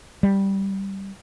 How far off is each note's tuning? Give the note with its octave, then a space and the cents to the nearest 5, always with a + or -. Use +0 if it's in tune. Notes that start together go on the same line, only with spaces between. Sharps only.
G3 -5